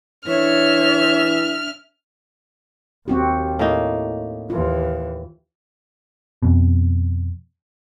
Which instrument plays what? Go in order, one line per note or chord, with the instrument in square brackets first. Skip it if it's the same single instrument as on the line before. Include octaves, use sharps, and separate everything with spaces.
[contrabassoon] E3 [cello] D4 E5 [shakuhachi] C#5 [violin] F6
[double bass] D#2 [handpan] C4 F#4 G4
[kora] A2 A#3 D#4
[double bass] D#2 E3 [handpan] F4
[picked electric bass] F2 B2